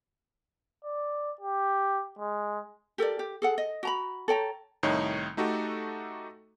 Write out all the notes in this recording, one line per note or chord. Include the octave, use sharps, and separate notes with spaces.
D5
G4
G#3
G4 A4 A#4 D5
G4
G#4 A4 F#5
D#5
F#4 A#5 B5
A4 C#5 G5 A#5
C2 A2 D#3 D#4 C#5
A3 D#4 F#4 G4 A4